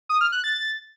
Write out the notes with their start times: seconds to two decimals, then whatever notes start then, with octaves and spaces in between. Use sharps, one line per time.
0.09 D#6
0.21 F6
0.32 F#6
0.44 A6